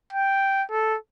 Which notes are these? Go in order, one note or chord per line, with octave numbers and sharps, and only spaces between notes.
G5
A4